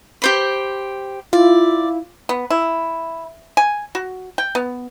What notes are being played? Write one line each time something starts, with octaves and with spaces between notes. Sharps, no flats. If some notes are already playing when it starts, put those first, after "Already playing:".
G4 C5 B5
E4 F4 D5
B3
E4
G#5
F#4
G5
B3